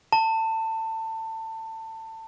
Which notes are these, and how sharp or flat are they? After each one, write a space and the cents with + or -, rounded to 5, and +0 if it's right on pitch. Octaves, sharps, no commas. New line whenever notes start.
A5 +25